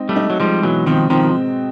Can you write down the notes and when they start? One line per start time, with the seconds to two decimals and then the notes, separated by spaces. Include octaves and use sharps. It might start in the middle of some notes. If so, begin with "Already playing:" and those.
Already playing: G#3 C4 D#4
0.09 G3 A3
0.16 D#4
0.30 F#3
0.40 F3 G3 G#3
0.63 B2 E3 F#3
0.86 D#3 F3 C4
1.10 D#3 F3 C4